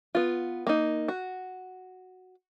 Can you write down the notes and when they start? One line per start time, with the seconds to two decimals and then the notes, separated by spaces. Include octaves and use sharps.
0.15 B3 F4
0.67 A#3 D#4
1.08 F#4